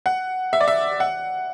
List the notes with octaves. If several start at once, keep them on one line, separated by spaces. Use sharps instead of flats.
F#5
E5
D5
E5
F#5